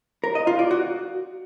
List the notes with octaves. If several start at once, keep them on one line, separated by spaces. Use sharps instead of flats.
A#4
D#5
F4
D5
F#4